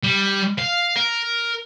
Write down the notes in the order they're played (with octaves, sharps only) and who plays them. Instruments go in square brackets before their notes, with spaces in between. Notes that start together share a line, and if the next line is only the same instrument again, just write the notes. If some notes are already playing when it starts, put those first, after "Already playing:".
[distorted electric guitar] G3
F5
A#4